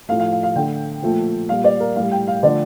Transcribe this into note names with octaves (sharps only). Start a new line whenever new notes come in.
A2 F3 A3 F5
F5
F5
F5
D3 A3 G5
A#2 F3 A3
A#2 G3 F5
D5
A#4
A2 G3 F5
G5
F5
D3 F3 A3 D5